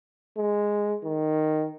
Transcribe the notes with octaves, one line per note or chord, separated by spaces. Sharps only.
G#3
D#3